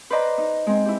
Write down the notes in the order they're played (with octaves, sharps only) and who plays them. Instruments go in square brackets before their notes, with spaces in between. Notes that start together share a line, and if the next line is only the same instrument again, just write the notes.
[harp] B4 C5 D5 D#5 A#5
D#4
G#3 C4
E4 G4